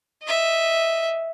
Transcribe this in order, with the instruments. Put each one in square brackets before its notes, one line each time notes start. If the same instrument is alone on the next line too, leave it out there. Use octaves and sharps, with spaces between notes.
[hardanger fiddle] D#5 E5